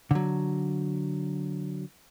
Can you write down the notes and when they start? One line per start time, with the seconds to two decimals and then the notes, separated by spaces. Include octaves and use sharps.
0.11 D3 F#3